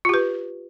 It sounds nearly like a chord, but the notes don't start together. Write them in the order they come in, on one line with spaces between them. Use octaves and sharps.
F4 G4 B4